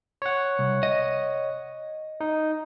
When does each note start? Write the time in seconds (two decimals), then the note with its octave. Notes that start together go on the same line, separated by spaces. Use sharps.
0.22 C#5 F#5
0.59 C2
0.83 D#5
2.21 D#4